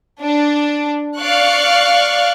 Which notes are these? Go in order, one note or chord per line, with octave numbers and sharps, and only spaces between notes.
D4
D5 F5 C#6 F#6